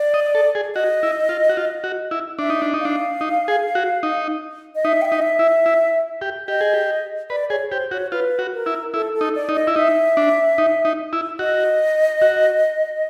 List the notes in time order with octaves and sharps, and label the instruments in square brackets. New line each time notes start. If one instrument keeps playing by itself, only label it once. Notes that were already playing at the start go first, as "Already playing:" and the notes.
Already playing: [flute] D5
[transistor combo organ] D#5
A4
G#4
[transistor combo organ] F#4 [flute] D#5
[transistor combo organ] E4
F4
F#4
F4
F#4
E4
[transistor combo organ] D4 [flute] E5
[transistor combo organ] D#4
D4
D#4
[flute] F5
[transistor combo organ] D4
D#4
G#4
F#4
D#4
[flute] D#5
[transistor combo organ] D#4 [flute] E5
[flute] G5
E5
[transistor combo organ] D#4
[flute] D#5
E5
[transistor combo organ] E4
E4
G4
[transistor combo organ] G4 [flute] D#5
[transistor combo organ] G#4
G4
[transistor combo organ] B4 [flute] D5
[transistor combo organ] G#4 [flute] C#5
[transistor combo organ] G4 [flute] C5
[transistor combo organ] F#4 [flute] C#5
[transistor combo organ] F4 [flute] B4
[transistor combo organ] F#4
[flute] A#4
[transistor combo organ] E4
[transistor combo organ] E4 [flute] A4
[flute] A4
[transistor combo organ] D#4
[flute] D5
[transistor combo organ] D#4
[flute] D#5
[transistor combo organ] E4
[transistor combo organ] D#4 [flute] E5
[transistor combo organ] D4
D#4
D#4
E4
[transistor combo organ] F#4 [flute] D#5
[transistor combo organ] F#4